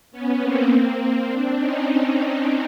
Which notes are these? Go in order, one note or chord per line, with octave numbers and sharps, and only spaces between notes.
B3 C#4
A#3 C4
C4 D4
C#4 D#4